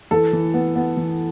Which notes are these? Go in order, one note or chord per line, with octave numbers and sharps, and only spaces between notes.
E3 A4
E3
B3
B3
E3